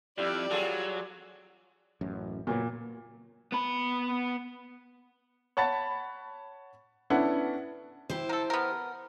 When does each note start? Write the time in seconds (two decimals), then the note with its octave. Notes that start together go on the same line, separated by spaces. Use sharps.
0.18 F2 G3 E4 G4 D5
0.51 F#3 F4 G#4 A4
2.01 A1 F#2
2.47 F#1 A#2 F#3 B3
3.52 B3 B5
5.57 C#5 F#5 A5 B5 A6
7.10 B3 C#4 D4 E4 A4 F#5
8.10 E4 G4 C5
8.29 A4 A#4
8.50 B3 A#4